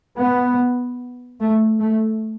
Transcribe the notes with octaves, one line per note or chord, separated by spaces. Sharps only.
B3
A3
A3